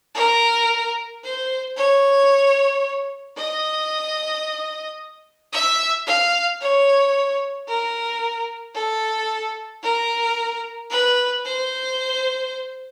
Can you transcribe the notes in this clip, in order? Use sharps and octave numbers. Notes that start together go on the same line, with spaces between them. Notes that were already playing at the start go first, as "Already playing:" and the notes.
A#4
C5
C#5
D#5
E5
F5
C#5
A#4
A4
A#4
B4
C5